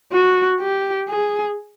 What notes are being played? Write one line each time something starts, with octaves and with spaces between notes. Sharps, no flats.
F#4
G4
G#4